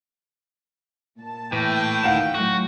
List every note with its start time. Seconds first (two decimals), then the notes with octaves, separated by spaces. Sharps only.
1.19 A#2 A5
1.52 A2 E3 G5
2.03 D2 D#3 F5 F#5 E7
2.35 A2 F#3 F#4